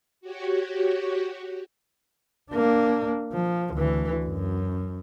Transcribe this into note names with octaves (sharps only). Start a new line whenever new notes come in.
F#4 G4 C#5
A#3 D4
F3
D2 E3
F#2